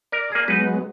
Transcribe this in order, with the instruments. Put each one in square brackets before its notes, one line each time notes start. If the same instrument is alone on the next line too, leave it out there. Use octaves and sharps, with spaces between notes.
[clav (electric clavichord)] A#4 [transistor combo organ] D5
[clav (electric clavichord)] A#3 G#4
[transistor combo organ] F#3 G#3 B3 [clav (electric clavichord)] D#4 B4